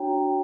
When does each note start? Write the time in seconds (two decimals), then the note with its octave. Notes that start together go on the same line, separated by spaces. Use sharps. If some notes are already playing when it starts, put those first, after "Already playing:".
Already playing: D4 F#4 C#5 G5 A#5